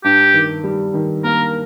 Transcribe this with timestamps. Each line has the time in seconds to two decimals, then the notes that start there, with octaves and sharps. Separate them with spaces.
0.04 G2 G4
0.34 D#3
0.64 G3
0.94 D#3
1.24 A#3 A#4